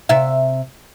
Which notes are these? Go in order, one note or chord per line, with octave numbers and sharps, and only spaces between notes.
C3 E5